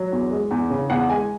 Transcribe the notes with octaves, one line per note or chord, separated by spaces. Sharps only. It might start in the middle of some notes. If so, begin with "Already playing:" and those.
Already playing: F#3
E2
G#3
E2
C#3
E2 F#5
G#3 G#5